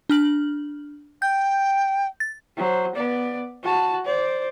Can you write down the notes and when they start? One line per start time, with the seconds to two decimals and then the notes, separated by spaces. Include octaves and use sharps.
0.10 D4 F6 F#7
1.22 G5 G6
2.20 A6
2.57 F#3 C5
2.95 B3 D5
3.63 F#4 A5
4.06 C5 D5